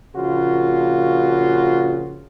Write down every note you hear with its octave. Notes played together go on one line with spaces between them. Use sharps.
A#1 C#3 F3 A#3 F4 F#4